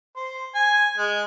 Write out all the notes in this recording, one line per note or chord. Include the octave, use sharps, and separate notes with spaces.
C5
G#5
G#3